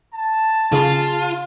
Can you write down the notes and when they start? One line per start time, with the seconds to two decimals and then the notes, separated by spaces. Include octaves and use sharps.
0.15 A5
0.72 C#3 F4 G#4